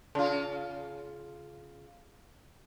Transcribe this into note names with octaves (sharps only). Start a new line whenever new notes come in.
C#3 F4